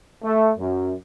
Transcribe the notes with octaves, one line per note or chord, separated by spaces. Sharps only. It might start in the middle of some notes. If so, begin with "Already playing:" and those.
A3
F#2